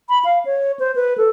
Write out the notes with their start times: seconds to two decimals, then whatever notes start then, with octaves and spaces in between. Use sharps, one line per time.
0.09 B5
0.25 F5
0.45 C#5
0.80 C5
0.95 B4
1.18 A4